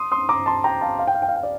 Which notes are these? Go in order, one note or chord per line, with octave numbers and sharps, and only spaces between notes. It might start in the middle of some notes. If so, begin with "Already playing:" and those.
Already playing: C6 D#6
C6 D#6
A#5 D6
A5 C6
G5 A#5
F5 A5
F5
G5
F5
G5
F5
G5
D5